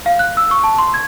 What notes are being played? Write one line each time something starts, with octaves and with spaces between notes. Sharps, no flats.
F5
F#6
E6
C#6
A5
C6
G#6